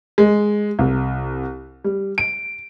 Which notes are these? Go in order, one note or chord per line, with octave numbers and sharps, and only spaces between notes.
G#3
C2
G3
D7